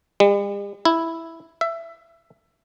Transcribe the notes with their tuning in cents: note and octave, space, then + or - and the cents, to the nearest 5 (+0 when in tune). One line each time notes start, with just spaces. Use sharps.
G3 +45
E4 -5
E5 +15